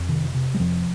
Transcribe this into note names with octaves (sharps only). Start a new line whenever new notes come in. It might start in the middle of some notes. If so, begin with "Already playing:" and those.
Already playing: F2
C3 D#3
C3
G3
F2 F3